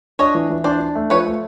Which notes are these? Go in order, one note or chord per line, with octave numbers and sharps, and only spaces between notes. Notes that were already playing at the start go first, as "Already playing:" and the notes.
D4 C#5 D#5
E3
E3
D4 C5 D5
D4
A3
F3 B4 C#5
A3